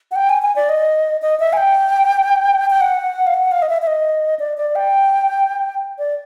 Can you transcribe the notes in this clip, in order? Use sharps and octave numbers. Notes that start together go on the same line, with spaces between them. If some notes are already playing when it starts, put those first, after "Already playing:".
F#5
G5
G#5
G#5
D5
D#5
D#5
E5
G#5
G5
G5
F#5
F5
F#5
F5
D#5
E5
E5
D#5
D5
D5
G5
D5